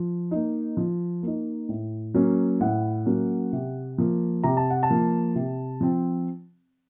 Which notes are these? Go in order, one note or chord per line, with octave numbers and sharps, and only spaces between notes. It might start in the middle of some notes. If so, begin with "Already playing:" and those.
Already playing: F3
A#3 D#4
F3
A#3 D#4
A2
F#3 A#3 C#4
A2 F#5
F#3 A#3 C#4
C3
F3 A#3
C3 A#5
A5
F#5
A5
F3 A#3
C3
F3 C4